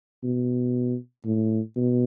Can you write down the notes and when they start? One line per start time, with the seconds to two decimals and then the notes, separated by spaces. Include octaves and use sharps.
0.23 B2
1.25 A2
1.76 B2